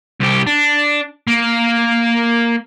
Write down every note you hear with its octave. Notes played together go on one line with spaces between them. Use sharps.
C2 G4
D4
A#3